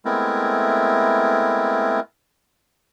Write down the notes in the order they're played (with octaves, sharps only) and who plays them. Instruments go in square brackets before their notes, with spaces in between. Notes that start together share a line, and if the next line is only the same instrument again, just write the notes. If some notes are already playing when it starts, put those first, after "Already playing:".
[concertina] G#3 A3 B3 C4 E4 A#4